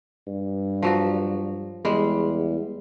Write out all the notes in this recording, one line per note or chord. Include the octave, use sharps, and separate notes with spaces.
G2
F3 F#3 F#4
E2 G3 G#3